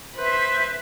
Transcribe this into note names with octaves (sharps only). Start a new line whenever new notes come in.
B4 C5 E5 C6